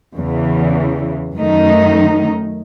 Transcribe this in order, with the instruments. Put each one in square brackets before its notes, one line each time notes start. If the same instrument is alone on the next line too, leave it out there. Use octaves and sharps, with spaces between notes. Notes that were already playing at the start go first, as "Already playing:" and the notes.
[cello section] E2 C#3 E3
F#2 D#3 A3 D#4